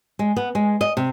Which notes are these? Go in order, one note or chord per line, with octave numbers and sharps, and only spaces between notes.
G#3
B3
G#3
D#5
C3